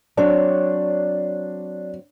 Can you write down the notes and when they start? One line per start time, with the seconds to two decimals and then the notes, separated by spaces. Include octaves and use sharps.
0.17 F#3 C4 D4 C#5